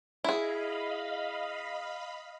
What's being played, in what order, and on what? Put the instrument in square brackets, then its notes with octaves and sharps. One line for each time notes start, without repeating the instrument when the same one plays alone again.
[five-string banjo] E4 G#4 [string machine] D#5 F5 B5